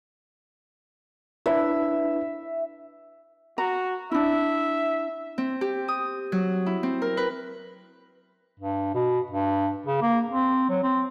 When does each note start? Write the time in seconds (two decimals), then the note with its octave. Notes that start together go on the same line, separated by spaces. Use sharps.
1.46 D4 E4 B4 E5
3.58 F#4 A#5
4.12 D4 E4 E5
5.38 C4
5.61 G4
5.88 D#6
6.32 F#3
6.66 E4
6.83 C4
7.02 A#4
7.17 B4
8.60 G2
8.94 B2
9.31 G2
9.86 C#3
10.02 A#3
10.31 C4
10.69 F#3
10.83 C4